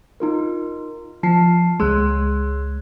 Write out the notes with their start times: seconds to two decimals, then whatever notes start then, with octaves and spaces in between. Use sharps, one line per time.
0.20 D#4 F4 A#4
1.23 F3 A5 C7
1.80 C#2 G#3 C6 E6 F#6